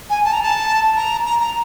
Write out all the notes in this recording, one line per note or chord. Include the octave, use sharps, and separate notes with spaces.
G#5
A5
A#5
A5
A#5
A#5
A#5